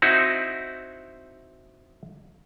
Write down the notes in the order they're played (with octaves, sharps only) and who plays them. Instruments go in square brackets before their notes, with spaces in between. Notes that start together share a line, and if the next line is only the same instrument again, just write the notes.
[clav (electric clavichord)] C4 D#4 E4 F#4